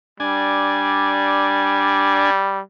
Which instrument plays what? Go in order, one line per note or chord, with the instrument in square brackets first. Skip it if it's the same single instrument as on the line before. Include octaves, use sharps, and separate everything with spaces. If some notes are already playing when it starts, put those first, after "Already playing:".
[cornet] G3 [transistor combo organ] D4 G#5